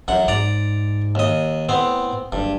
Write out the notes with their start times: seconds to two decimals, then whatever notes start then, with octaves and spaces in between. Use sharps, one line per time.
0.08 A1 F#2 F#5
0.28 G#2 D5 A#5
1.15 D#2 D#5
1.69 A2 B3 C4
2.32 F#1 G2